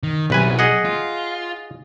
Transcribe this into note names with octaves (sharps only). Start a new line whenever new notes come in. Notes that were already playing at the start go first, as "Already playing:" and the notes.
D#3
C2 B2 F#3 B4 G#5
G#4 D#5 F#5
F4